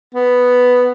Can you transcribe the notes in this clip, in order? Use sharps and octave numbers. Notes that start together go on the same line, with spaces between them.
B3